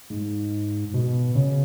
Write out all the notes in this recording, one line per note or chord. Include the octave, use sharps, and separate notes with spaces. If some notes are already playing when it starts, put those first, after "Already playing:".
G#2
B2
C#3